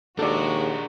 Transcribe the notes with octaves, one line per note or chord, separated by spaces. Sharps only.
D#2 G#3 D4 F#4 A4 A#4 D5